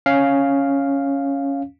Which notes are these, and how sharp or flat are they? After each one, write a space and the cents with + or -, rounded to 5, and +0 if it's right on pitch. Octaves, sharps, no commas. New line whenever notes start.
C#4 +0 F5 +0